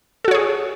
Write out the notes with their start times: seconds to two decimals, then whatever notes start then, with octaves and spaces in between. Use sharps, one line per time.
0.25 A4
0.28 F#4
0.31 C#5
0.35 G#4